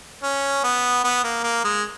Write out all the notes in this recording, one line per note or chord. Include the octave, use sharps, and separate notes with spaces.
C#4
B3
B3
A#3
A#3
G#3